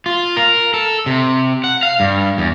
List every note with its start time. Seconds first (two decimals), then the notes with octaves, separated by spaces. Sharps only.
0.06 F4
0.37 A#4
0.74 A4
1.06 C3
1.64 F#5
1.83 F5
2.00 G2
2.38 E2